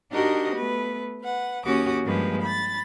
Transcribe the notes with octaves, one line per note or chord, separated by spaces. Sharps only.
D4 D#4 F#4 G4 A#4 D#5
A3 B3 B4
B4 F#5
D#2 C#4 F#4 G4 D6 D#6
G2 F3 G#3 A#3 G4 B4
B5 A6